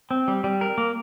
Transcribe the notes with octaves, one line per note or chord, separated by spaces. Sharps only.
C4
G3
G3
A#4
A#3